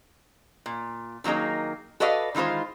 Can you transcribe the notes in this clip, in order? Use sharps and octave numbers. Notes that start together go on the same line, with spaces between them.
A#2
D#3 F#3 A#3 D#4 G#4
F#4 A4 B4 D5 D#5 F5
D#3 E3 G#3 F4 C5